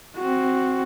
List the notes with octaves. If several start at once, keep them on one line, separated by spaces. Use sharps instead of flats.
C4 F#4